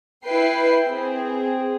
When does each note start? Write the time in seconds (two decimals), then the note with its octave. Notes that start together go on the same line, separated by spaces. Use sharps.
0.24 E4 B4 G5 C7
0.88 C4 G#4